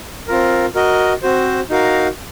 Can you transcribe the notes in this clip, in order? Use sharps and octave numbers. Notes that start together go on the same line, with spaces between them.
C4 F4 A#4
F#4 A#4 D#5
C4 F#4 C5
D#4 F#4 A#4 F5